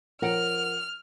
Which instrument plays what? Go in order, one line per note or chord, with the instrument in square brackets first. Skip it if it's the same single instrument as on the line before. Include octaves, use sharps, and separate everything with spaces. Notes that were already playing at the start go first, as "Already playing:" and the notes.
[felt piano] F3 C#5 D7 [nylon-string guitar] A#4 F#5 [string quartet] F6